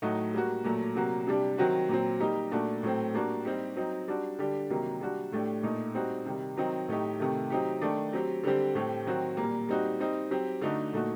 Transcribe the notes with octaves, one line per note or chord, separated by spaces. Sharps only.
A2 F#3 A3 D#4 F#4
G3 A#3 F#4
A#2 F#3 A3
C3 F#3 A#3 F#4
C3 G3 D4 G4
D#3 F#3 C4 F#4
A#2 F#3 C4
G3 A#3 D#4 G4
A#2 A3 D4 F#4
A2 F#3 A3 C4
G3 A#3 D4 F#4
G3 C4 D#4 G4
F#3 C4 D#4
G3 D4 F#4
D3 G3 D4 G4
C3 D#3 F#3 A#3
G3 D4 F#4
A2 A3 D4 G4
A#2 A3 D#4
G3 C4 D#4 F#4
C3 D#3 G3
D#3 F#3 C4 D#4
A2 A3 D#4 G4
C3 D#3 A3
F#3 C4 D#4 G4
D#3 A3 D4
F#3 C4 G4
D3 G3 C4 G4
A2 A3 C4 G4
D#3 F#3 C4 F#4
A#2 G3 A#3
G3 C4 D#4 F#4
G3 C4 D#4
F#3 C4 G4
D3 A3 D#4 F#4
A#2 A3 D#4 F#4